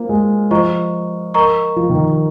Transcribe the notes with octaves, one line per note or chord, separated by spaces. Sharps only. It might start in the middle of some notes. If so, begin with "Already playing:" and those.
Already playing: A#3 F4 C5 F5
G#3
F3 C5 D#5 A#5 C#6
A#4 D#5 A#5 C#6
F3
D#3